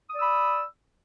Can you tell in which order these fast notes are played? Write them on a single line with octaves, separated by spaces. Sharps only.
D#6 D5 E6 B5